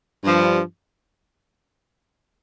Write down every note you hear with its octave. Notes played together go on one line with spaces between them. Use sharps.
G2 F3